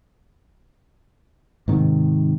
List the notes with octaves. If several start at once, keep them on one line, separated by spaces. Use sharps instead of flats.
G#2 C3 D#3